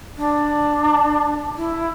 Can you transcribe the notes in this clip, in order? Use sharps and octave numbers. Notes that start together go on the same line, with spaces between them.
D4
E4